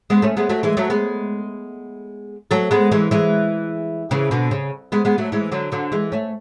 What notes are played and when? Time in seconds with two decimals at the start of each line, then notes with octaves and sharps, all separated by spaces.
0.10 G#3 B3
0.22 A3 C#4
0.37 G#3 B3
0.49 F#3 A3
0.63 E3 G#3
0.77 F#3 A3
0.90 G#3 B3
2.51 F#3 A3
2.71 G#3 B3
2.92 E3 G#3
3.11 E3 G#3
4.11 C#3 E3
4.31 B2 D3
4.51 C#3
4.92 G#3 B3
5.05 G#3 B3
5.18 F#3 A3
5.32 E3 G#3
5.52 D3 F#3
5.72 D3 F#3
5.92 E3 G#3
6.12 A3 C#4